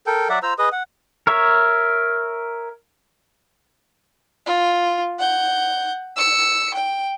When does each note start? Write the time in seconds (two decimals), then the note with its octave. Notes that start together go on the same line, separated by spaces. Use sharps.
0.07 A4 A#4 G5
0.29 F#3 D5 E5 F#5
0.43 F4 C5 A#5 E6
0.59 G#4 B4 D#5 D#6
0.72 F#5
1.27 A#4 C#5 E5
4.46 F4
5.19 F#5 G6
6.17 E6 C#7
6.74 G5